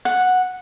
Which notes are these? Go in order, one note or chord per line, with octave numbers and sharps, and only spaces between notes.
F#5